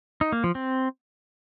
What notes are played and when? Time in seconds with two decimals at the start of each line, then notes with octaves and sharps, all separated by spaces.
0.21 D#4
0.32 A#3
0.44 F3
0.55 C4